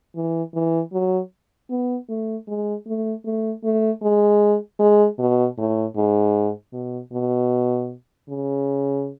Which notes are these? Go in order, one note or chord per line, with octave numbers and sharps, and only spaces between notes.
E3
E3
F#3
B3
A3
G#3
A3
A3
A3
G#3
G#3
B2
A2
G#2
B2
B2
C#3